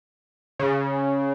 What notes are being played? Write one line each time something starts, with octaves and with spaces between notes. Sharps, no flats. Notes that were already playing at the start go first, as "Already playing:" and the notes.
C#3